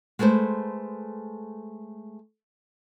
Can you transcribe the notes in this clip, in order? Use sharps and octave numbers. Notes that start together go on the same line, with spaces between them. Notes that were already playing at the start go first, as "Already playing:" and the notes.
G#3 A3 A4 B4 C5